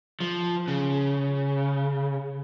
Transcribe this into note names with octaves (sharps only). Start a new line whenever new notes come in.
F3
C#3